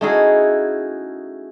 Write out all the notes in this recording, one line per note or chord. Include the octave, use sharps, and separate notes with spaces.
A3 C#4 D#4 E4 F#4 G#4